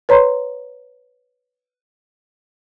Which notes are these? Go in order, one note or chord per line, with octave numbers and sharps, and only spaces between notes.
B4 C#5 A#5 C6